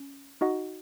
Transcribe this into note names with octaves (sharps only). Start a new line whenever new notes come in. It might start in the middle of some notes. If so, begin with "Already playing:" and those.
Already playing: C#4
D#4 F#4 D#5 F#5